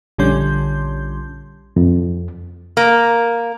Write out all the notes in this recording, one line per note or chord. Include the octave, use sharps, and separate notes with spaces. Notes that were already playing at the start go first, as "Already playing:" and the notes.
A#1 D3 G3 C#4 C6 G6
F2
A#3